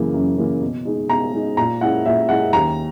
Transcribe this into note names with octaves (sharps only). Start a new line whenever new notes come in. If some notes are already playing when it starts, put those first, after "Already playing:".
Already playing: F#2 C#3 E3 A#3
F#2
C#3 E3 A#3
B2
G#3 D#4
B2 A#5
G#3 D#4
A#2 A#5
G#3 C#4 E4 F#5
A#2 E5
G#3 C#4 E4 F#5
D#2 A#5